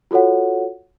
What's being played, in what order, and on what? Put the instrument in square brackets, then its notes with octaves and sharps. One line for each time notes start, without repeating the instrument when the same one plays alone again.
[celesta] F4 F#4 A4 C#5 F#5